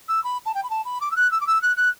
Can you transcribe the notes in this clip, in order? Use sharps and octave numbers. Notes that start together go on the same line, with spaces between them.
E6
B5
A5
G5
B5
A5
B5
D6
E6
F#6
E6
D6
E6
F#6
F#6